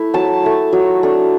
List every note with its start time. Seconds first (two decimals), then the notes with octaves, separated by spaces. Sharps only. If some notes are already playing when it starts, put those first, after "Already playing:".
Already playing: A3 E4
0.14 F#3 A5
0.44 A3 E4
0.73 F#3
1.03 A3 D4